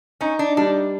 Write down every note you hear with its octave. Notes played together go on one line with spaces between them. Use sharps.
C#4 D#4
D4
G3 D4